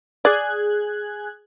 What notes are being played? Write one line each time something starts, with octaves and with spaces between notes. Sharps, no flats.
G#4 D5 F#6 G#6